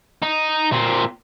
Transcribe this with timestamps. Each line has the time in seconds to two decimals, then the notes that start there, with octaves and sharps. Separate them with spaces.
0.23 D#4
0.72 A#2 C4